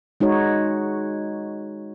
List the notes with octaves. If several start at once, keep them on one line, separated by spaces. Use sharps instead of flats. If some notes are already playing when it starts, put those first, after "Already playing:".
G#3 D#4 F#4 C#5